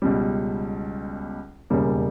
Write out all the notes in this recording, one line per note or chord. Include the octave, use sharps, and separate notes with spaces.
C#2 B2 G3
E1 D#2 C#3 G3 A#3